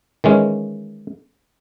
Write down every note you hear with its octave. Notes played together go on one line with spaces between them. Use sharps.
D#3 E3 G#3 C#4